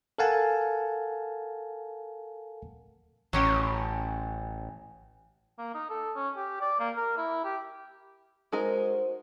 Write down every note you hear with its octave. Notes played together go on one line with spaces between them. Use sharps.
A4 A#4 F5 F#5 G#5 A5
A1 F#3 C#4 G4
A#3
D#4
A4
C#4
G4
D5
A#3
A#4
E4
G4
G#3 D#4 F#4 A#4 C5